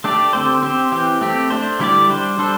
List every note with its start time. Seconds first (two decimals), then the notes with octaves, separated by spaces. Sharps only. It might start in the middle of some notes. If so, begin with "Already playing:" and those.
0.04 A3 D4 G4 D5
0.33 D3 C4 G4 C5
0.63 C4 G4 C5
0.92 E3 C4 G4
1.21 A3 C4 G4
1.50 A3 D4 C5
1.79 D3 G3 E4 G4 D5
2.09 G3 D4 C5
2.38 G3 D4 A4 C5